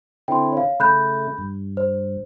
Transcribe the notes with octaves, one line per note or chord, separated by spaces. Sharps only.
D3 C4 E4 G5 C6
C#5 F5
C#3 A3 B5 F#6 G6
G2
C5